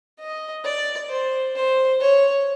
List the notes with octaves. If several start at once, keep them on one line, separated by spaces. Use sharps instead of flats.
D#5
D5
C5
C5
C#5